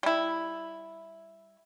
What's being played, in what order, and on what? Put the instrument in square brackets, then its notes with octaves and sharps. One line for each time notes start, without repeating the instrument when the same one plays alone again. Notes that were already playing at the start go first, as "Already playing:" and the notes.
[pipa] G3 E4